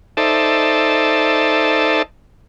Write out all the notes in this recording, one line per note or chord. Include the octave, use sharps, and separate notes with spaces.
D#4 A4 C5 D5 E5 A5